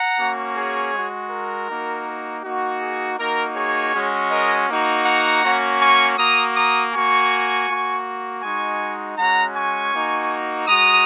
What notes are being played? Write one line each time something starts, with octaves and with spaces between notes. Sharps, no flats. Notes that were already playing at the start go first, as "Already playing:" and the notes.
Already playing: F#5 A#5
A#3 C#4 F#4
G#4 C#5
G#3 F#4
A#4
A#3 D#4 F#4
A#3 D#4 F#4
G#4
A#3 D#4 F#4 A#4
G#4 C#5
G#3 C#4 F#4
A#4 D#5
A#3 D#4 F#4
F#5 A#5
A#3 C#4 F#4
G#5 C#6
A#3 F#4 A#5 D#6
A#5 D#6
A#3 F#4 G#5 C#6
A#3 F#4
G#3 D#4 F#4 G#5 C#6
G#3 C#4 F#4 F#5 A#5
G#5 C#6
A#3 D#4 F#4
G#3 F#4 A#5 D#6